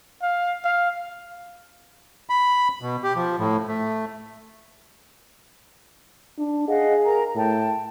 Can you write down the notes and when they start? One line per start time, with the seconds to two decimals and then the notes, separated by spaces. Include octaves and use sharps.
0.22 F5
0.64 F5
2.30 B5
2.82 B2
3.03 G4
3.16 F3
3.39 A2
3.68 A3
6.39 D4
6.68 G#4 D#5 F5 F#5
7.05 A#4 A#5
7.35 A2 G5 A5